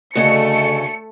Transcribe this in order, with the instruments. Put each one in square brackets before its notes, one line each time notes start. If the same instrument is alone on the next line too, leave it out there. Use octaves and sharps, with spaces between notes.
[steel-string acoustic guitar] D2 C#3 [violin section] A3 C#7 [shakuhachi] D#5